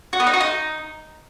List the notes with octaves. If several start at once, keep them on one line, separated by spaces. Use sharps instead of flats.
F#4
B3
D#4
F#4
D#4